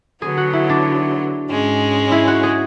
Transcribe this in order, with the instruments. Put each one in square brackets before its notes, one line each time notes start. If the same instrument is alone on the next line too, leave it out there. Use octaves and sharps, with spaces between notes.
[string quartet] D3 F#3 B3 [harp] G#4
[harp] F#4
E4
D4
[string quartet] G#2 G#3 C#4
[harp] E4
F#4
G#4